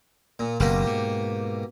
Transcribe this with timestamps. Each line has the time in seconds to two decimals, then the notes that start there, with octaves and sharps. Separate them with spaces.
0.39 A#2
0.60 F#1 B2 A#3 G4
0.87 G#2